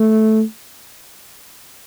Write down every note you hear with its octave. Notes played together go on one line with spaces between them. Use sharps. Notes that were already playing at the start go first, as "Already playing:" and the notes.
Already playing: A3